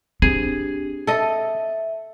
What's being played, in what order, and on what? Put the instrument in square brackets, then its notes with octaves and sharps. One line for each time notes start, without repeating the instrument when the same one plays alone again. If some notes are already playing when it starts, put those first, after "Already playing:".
[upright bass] C4 [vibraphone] D4 G4 [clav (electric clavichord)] G#4
[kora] A4 D#5 [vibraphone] E5